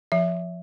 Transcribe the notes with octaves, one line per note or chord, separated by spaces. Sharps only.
F3 E5